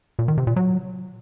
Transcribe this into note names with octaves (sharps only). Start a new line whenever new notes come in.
A#2
D#3
C3
A#2
F#3